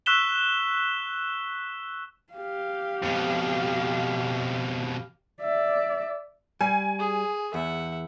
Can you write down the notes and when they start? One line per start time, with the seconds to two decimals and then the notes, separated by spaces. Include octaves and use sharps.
0.06 C#6 E6 F#6 B6 E7 G7
2.33 G4 F5
3.03 F2 B2
5.41 D5 E5
6.61 G3 G#5
6.99 G#4
7.54 E2 E5 F#5